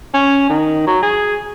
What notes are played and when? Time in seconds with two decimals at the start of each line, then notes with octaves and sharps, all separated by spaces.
0.14 C#4
0.49 D#3
0.87 F#3
1.02 G#4